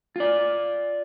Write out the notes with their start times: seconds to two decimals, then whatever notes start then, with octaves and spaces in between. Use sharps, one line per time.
0.16 F4 D5